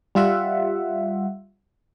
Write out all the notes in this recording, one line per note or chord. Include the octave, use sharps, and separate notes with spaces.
G3 F4 E5 F#5